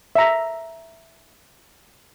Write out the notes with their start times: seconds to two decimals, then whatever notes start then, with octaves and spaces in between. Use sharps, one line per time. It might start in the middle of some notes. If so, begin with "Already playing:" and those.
0.16 E5 A#5